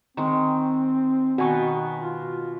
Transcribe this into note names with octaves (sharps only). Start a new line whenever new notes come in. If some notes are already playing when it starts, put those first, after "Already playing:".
D#3 G#3 C4
B2 D#3 F#4 B4 G#5 C#6
F4